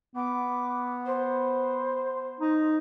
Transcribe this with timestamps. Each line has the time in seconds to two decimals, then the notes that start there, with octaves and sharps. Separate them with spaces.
0.16 B3 D6
1.06 C5
2.40 D#4